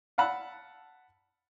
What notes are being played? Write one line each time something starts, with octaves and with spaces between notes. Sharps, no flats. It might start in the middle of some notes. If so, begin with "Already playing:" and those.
F5 F#5 A5 B5 E6